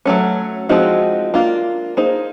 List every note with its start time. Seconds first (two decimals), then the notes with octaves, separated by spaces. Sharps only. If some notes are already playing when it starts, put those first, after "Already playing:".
0.06 F#3 A3 C#4
0.69 F3 G#3 C4 D#4 F#4
1.34 A#3 D4 F4
1.97 A#3 D#4 G#4 C5